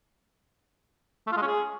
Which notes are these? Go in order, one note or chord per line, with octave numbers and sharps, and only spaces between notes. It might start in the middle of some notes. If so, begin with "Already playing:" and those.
A3
F4
G#3
C#4
G#4